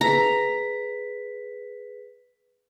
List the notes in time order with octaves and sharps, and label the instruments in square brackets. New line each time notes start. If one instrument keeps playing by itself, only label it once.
[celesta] G#4 B4 B6 [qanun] A#5